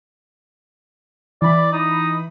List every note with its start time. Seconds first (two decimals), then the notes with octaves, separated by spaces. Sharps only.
1.42 E3 D5 B5
1.73 D#4